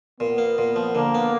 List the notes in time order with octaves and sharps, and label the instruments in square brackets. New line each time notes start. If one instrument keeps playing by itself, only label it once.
[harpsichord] A#2 [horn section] B3
[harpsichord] A#3
A#2
F3
[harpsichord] D3 [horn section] A#3
[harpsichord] B3